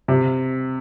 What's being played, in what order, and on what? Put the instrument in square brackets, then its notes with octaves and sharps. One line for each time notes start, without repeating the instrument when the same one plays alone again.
[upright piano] C3